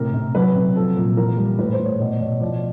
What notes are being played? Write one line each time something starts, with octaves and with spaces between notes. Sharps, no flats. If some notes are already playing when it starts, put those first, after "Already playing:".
Already playing: A2 C3 A#4
C3
F#3 B4
C3
F3 A4
A#2
E3 A#4
G3
A2 B4
C5
A2
C#5
B2 D5
B2 C#5
F3 D5